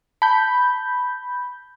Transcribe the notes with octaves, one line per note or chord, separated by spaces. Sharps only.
A5 B5 G6